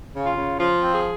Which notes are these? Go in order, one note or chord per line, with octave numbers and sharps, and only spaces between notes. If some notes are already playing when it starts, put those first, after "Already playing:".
C#3
F4
C#3
F3 F4
C4
G#4